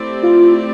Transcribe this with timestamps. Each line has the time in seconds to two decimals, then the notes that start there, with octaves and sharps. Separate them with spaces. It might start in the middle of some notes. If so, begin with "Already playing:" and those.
Already playing: A3 C4 E4 G4 D5
0.23 F4